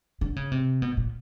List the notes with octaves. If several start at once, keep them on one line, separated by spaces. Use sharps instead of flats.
D3
C#3
C3
B2
A#2